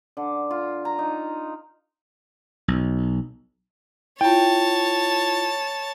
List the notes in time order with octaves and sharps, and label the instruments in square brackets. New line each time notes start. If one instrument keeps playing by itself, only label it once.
[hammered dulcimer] D3
F4
A#5
D#4
[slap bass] B1
[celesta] E4 F4 [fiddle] C#5 A5 [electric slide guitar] G5